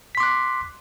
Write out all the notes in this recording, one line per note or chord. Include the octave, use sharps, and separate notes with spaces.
C6 D6 F#6 B6